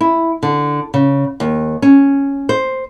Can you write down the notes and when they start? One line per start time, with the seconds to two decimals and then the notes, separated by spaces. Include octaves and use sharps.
0.01 E4
0.43 D3
0.94 C#3
1.40 D#2
1.82 C#4
2.49 C5